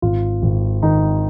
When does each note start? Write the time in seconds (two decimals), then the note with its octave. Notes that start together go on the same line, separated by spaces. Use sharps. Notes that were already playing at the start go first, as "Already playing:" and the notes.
0.02 G#1 F4
0.42 G#1
0.82 D#3 D#4